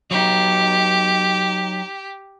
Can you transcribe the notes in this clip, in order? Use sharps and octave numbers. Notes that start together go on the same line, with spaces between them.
F#3 D#4 G4